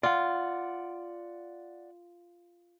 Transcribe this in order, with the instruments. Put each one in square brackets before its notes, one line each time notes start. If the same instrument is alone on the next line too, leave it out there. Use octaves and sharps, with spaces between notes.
[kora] F4 [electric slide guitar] D5 F#5